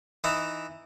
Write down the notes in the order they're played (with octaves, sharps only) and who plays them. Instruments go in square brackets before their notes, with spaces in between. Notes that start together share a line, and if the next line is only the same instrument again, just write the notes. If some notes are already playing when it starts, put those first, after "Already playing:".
[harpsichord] E3 D#4 E4